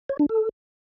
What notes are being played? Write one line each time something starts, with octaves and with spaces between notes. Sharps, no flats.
C#5
D4
A4